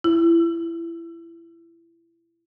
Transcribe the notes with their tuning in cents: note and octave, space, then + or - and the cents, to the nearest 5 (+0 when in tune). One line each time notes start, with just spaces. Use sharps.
E4 +25